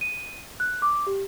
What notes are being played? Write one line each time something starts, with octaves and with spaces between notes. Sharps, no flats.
D#7
F#6
D6
G4